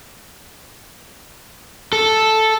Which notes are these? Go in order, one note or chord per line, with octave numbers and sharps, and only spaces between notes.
A4